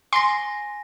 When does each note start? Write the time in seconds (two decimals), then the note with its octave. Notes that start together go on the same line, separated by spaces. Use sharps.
0.13 G#5 C6 A#6